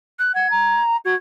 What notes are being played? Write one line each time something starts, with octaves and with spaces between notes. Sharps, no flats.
F#6
F#5 G#6
A#5
F#4 G#6